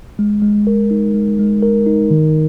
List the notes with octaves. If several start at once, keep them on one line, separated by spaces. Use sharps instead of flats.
G#3
G#3
A#4
D#4
G#3
G#3
A#4
D#4
D#3